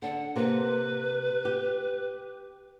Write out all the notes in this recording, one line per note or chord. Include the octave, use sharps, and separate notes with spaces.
D3 D4 F#5
C3 A#3 B4
G4